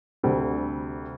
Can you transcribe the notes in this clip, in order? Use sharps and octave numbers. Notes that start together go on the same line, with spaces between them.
D2 C3 G3